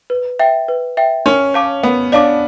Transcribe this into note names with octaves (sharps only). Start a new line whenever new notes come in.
B4
E5 G5
B4
E5 G5
C#4 A#4
C#5 F5 A5 D6
B3 A#4
D4 C#5 F5 A5 D6